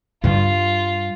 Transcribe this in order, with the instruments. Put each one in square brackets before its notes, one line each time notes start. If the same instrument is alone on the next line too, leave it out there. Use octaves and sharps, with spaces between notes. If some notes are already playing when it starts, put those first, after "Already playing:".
[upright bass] G2 G3 [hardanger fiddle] F4